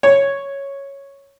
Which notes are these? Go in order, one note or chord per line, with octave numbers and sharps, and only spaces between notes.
C#5